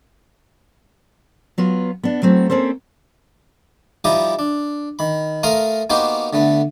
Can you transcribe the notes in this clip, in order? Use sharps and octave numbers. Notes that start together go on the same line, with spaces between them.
F#3 B3 F4
B3 D4
F#3 A3 C4 E4
A#3 C4 C#4 A4 C5
F3 G3 D#4 E4 G4 D#5
D4
D#3 B5
A3 A#4 F5 A#5 C6 D#6
A#3 B3 D#4 F#4 G4 C5
D3 A3 B3